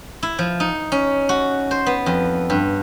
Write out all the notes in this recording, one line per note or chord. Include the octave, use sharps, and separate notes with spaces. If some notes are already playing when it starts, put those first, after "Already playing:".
E4
F3
D#4
C#4
F#4
C5
B3
F2
G2